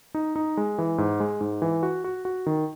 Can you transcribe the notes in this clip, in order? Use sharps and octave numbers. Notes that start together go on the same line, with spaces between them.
D#4
D#4
G#3
E3
G#2
G#3
G#2
E3
F#4
F#4
F#4
D#3